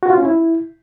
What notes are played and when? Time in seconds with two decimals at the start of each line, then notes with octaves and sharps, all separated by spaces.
0.03 F#4
0.10 F4
0.17 C#4
0.25 E4